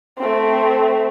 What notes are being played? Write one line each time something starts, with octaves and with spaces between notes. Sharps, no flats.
A3 C4